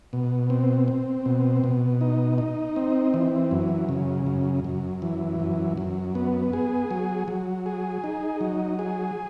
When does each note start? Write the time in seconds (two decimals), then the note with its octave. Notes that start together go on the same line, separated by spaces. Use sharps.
0.13 B2
0.50 C4
0.88 C4
1.26 B2
1.64 B2
2.01 D#4
2.38 D#4
2.76 C4
3.14 E3
3.51 F#2
3.89 C#3
4.26 F#2
4.64 F#2
5.02 E3
5.40 F#2
5.77 F#2
6.15 B3
6.53 G#4
6.91 F#3
7.28 F#3
7.66 G#4
8.04 D#4
8.41 F#3
8.79 G#4